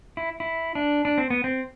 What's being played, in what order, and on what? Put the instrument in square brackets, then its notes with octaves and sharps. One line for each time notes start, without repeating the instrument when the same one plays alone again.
[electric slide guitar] E4
E4
D4
D4
C4
B3
C4